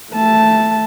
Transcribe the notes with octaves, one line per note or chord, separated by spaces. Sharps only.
A3 A5